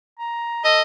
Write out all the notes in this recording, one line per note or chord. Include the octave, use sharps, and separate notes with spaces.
A#5
A4 D#5